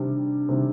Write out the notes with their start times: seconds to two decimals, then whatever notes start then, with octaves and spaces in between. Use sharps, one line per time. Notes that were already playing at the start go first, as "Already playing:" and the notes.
Already playing: C3 D#3 G3 D4
0.49 C3 D#3 G3